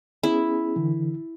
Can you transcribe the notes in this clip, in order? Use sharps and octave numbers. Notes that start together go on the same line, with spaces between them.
B3 C#4 E4 G#4
D3 E3